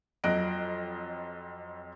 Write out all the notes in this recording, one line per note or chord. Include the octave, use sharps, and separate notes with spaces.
F2 F#3 D#5 F#6 D7